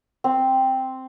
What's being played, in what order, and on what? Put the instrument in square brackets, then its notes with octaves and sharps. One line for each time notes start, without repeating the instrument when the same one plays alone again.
[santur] C4